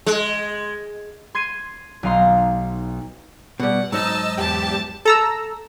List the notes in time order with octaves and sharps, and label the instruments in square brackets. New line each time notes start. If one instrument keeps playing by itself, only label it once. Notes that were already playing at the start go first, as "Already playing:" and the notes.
[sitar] G#3
[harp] C6 G#6 C7 D#7
B1 D#4 F5 A#5 C6
[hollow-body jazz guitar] B2 G3 [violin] F#5
[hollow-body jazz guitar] G#2 F#3 D#4 [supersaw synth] D#5 E6 [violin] A5
[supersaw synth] E2 G4 [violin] A5
[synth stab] A4 A#5 E6